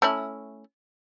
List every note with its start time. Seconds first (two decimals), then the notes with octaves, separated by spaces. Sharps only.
0.02 A3 C#4 E4